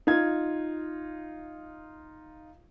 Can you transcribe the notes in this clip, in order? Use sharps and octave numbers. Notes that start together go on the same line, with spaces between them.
D#4 F4 G#6